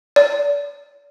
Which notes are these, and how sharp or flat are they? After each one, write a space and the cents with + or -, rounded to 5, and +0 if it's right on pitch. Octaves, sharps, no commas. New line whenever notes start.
D5 -35